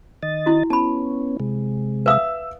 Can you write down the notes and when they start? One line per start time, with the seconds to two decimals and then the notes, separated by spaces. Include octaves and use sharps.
0.23 D#3 D#5 A6
0.46 E4 F#4
0.70 B3 C#4 A5 B5
1.40 C3 G#3
2.06 B4 E5 F5 D#6 E6